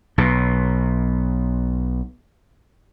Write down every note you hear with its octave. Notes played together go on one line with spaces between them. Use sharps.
B1 B2